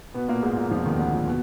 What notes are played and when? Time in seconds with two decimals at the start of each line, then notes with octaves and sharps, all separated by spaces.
0.14 B2 B3
0.28 A#2 A#3
0.43 G#2 G#3
0.57 A#2 A#3
0.71 F2 F3
0.85 D#2 D#3
0.99 D2 D3
1.13 A#2
1.27 B2